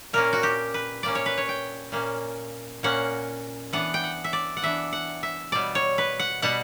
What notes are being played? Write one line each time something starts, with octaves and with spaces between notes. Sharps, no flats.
A#2 A#3 C#4 A#4
F#4
G4
B4
A#2 A#3 C#4 D5
C#5
B4
C#5
G5
A#2 A#3 C#4
A#2 A#3 C#4 F#5
E3 B3 D4 F#5
G5
F#5
E5
D5
F#5
E3 B3 D4 E5
F#5
E5
B2 G3 B3 D5
C#5
B4
F#5
B2 G3 B3 F#5